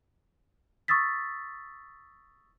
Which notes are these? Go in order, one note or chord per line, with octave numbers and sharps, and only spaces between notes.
C#6 D#6 E6 A6 B6